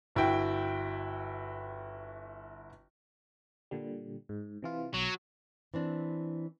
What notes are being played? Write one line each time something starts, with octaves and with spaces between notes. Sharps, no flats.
G1 E4 F#4 G5
A#2 D3 G3
G#2
C3 E3 F4
B1 F#3
E3 C4 D4